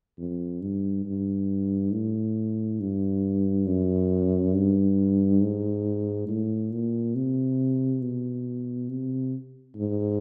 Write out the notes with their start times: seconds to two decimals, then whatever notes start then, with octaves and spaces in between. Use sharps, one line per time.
0.18 F2
0.62 G2
1.05 G2
1.93 A2
2.80 G2
3.67 F#2
4.54 G2
5.42 G#2
6.29 A2
6.72 A#2
7.15 C3
8.02 B2
8.89 C3
9.76 G#2